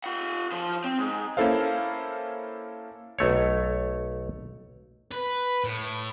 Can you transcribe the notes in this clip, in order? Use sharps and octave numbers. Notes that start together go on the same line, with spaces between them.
F4 F#5
F3 C5
C4
G#2
A#3 C#4 E4 A4 C5 F5
B1 A3 C#5
B4
A2